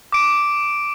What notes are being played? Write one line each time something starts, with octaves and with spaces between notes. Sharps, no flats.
D6 D7